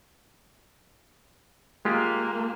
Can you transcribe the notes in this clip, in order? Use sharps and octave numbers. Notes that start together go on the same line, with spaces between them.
G#3 A#3 F4 G4